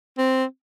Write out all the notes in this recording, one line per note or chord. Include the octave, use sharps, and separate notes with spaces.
C4